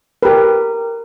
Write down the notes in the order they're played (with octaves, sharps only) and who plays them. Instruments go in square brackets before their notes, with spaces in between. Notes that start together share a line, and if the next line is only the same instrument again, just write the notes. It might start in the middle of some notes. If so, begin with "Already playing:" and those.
[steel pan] G4 B4 [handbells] A#4